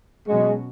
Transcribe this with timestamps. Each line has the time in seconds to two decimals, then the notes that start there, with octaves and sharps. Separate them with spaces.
0.28 B2 F#3 G#3 C#4 F#4